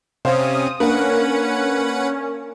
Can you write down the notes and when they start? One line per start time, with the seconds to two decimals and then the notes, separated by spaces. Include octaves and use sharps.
0.25 C3 C#4 C5 F5 D#6
0.80 A#3 C#4 D4 A#4 B4 F#5